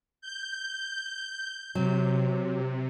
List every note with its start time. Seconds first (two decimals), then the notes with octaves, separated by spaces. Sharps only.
0.21 G6
1.75 C3 F#3